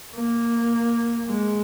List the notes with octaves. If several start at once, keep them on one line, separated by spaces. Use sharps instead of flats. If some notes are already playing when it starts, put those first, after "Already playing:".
A#3
G#3